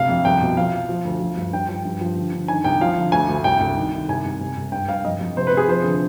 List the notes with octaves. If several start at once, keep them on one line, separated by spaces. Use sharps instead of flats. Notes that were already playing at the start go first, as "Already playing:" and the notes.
Already playing: D2 C3 F5
F2
C2 G5
B2
F3 F5
F3
F3
D2
F3
G2
G2 G5
F3 G5
G2
F3
D3
D3
D#3 G#5
C2 G5
F3 F5
D3
D2 G#5
D2
C2 G5
C2
D#3
D#3
C2 G#5
C2
C3
C2
G2 G5
G2 F5
F2 D#5
F2
C3 C5
B4
C3 G#4
F3 C5
D3